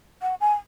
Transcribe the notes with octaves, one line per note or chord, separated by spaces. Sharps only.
F#5
G#5